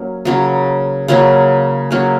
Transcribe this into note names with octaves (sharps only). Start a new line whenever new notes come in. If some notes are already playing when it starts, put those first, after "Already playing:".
Already playing: F#3 A#3 C#4
C#3 F#3 A#3 C#4
C#3 F#3 A#3 C#4
C#3 F#3 A#3 C#4